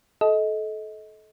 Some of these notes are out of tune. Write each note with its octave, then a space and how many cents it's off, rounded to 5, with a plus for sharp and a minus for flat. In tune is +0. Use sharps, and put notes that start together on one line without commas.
A4 -25 D#5 +25